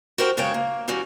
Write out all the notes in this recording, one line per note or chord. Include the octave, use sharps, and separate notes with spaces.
F#4 G4 A#4 C5 G5
F#2 C#3 G#3 C#5 G5 A5
A#3
D#2 G3 C#4 F#4